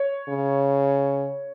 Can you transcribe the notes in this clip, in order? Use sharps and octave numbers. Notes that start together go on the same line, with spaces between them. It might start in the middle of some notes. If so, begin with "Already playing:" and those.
Already playing: C#5
C#3